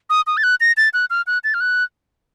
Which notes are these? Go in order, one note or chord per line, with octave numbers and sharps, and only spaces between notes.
D#6
D#6
A6
F#6
A#6
A6
F#6
F6
F#6
A6
F6
F#6